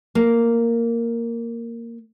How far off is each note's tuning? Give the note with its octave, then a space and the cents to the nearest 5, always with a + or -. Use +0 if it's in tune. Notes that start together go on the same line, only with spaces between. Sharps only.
A#3 -5